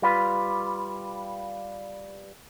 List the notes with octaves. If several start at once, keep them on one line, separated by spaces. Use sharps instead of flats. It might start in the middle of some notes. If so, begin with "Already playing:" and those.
G3 F4 B4